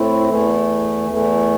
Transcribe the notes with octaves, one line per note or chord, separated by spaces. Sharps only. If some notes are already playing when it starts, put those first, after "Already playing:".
Already playing: A2 A3 C4 E4
E2 E3 A3
E2 E3 A3